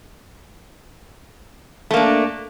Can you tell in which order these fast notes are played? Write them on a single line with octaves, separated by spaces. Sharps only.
A3 A#3 D4